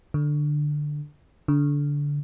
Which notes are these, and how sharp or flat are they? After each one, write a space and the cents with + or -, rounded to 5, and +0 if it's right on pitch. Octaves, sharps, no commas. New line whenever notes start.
D3 +10
D3 -20